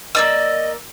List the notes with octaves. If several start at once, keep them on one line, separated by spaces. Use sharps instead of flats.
A#3 D5 D#5 E6